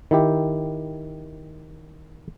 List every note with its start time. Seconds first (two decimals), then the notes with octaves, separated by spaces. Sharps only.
0.11 D#3 E4 G4